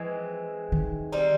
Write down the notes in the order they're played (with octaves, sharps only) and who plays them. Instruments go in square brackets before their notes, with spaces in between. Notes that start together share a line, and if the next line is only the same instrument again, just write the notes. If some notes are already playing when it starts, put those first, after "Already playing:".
Already playing: [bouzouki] E3 G#3 C4 [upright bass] F3
[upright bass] D#3
[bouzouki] G3 C4 D#4